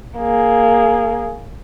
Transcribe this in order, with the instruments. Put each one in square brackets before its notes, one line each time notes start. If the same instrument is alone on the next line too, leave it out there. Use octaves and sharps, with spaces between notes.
[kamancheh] A#3 G#4